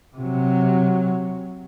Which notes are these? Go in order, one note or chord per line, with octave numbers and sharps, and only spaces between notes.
C3 F#3